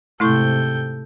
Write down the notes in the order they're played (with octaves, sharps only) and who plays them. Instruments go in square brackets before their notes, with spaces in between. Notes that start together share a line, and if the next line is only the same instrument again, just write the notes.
[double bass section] G#2 C3 [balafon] A3 E4 C#6 [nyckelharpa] A4 G5